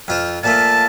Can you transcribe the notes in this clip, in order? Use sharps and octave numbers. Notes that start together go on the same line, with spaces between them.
F2 F4 C5
A#2 F3 A3 A5